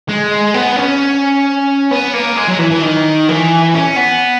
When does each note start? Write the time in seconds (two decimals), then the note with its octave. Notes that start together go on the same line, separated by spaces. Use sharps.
0.09 G#3
0.54 B3
0.76 C#4
1.91 B3
2.14 A#3
2.37 G#3
2.49 F#3
2.59 E3
2.71 E3
2.83 D#3
3.29 E3
3.74 C#4
3.96 B3